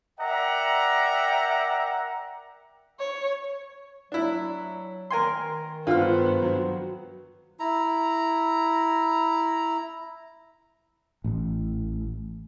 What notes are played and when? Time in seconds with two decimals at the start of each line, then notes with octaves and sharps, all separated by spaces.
0.19 A#4 D5 E5 F#5 G5 A#5
2.99 C#5
4.12 F#3 D4 E4
5.11 D#3 A#4 G#5 C6
5.87 G2 D3 B3 F4 C5 F6
6.42 F#3
7.60 E4 A#5
11.24 A1